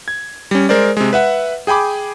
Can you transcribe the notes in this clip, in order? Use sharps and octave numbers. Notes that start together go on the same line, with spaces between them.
G#6
G3 C#4
G#3 A#4 C5 D5
C3 G#3
B4 E5 F#5
G#4 G5 G#5 B5 D6